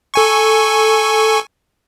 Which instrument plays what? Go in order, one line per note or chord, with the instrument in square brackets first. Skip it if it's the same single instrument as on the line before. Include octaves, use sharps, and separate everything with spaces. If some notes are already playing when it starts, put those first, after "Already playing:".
[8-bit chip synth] A4 G#5 C#6